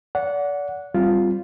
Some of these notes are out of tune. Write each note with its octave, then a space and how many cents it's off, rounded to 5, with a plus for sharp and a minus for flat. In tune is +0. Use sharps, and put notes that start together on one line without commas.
D5 -35 F#5 -10
G3 +0 C4 +0 F4 +0